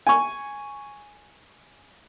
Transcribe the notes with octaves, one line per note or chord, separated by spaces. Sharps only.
G#5 C#6